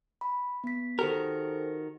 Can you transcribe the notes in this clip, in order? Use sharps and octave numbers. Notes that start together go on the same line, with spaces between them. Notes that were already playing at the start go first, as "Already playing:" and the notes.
B5
B3 B6
D#3 F#4 G4 A4 A#4 C5